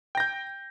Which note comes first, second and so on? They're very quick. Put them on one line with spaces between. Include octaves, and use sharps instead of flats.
G5 A#6 G6